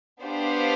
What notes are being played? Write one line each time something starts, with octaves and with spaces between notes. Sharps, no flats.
B3 D4 G4 C5 F5